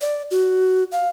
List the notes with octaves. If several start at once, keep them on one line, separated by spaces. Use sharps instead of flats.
D5
F#4
F5